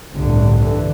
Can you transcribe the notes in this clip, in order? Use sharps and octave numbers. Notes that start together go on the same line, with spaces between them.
G1 C2 A2 D3
D3 E3